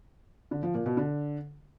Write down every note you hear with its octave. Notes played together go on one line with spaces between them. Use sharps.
D3
F3
A#2
B2
D3